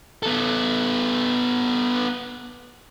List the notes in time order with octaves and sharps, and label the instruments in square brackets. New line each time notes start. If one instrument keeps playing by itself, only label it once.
[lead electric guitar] B3 A4